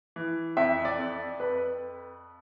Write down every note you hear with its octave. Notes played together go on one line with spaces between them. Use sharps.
E3
F2 E5
D5
F2
F2 B4